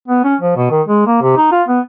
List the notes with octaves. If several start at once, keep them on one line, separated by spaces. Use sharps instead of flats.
B3
C#4
F3
B2
D#3
G#3
A#3
C3
D#4
F4
B3